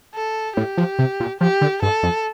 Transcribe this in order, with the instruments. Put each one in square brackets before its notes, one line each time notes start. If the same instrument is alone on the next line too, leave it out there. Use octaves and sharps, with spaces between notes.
[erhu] A4
[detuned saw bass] A2 [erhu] G4
[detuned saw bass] F3
C3
A#2
[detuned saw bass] F3 [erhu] G4
[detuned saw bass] D3
[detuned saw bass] G2 [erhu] A4
[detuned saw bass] F2